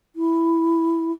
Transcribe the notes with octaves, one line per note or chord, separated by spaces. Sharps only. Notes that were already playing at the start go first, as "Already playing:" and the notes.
E4